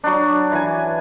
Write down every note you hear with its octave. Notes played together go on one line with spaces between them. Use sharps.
F#3 D4
E3 G#5